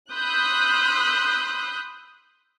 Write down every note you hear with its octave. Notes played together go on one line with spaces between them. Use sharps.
B5 C6 D#6 E6 F#6 G6